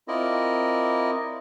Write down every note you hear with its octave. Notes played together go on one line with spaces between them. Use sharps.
C4 E4 F4 A#4 D5 D#5